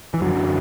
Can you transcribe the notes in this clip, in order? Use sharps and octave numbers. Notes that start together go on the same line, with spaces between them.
E3
F#2 D3 F#3